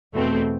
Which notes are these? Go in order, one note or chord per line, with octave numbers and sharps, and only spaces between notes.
E2 B2 A3 C4